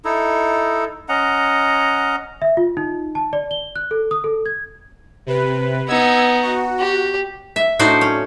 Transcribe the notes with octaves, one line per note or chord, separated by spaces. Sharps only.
D#4 E4 A4
C#4 D#5 F#5 A#5
E5
F4
D#4
A5
D5
G7
F#6
A4
D#6
A4
G#6
C3 B4
B3 D#4 E6 G#6
F#4
G4
E5
A2 D4 D#4 F#4 C5 D5
C#4